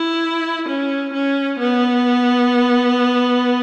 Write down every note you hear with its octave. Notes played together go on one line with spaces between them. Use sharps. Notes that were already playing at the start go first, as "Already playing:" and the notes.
Already playing: E4
C#4
C#4
B3